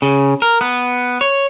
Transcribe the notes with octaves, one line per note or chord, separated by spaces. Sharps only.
C#3
A#4
B3
C#5